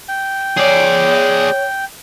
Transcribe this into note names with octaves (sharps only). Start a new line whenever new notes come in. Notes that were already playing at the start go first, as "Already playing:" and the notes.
G5
G#4 C#5 D5